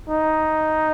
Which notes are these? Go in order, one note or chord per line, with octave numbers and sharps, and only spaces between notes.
D#4